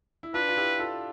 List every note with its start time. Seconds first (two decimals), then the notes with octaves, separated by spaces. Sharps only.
0.23 E4
0.34 D4 F4 B4
0.49 F4
0.57 E4 G4
0.79 F4 A4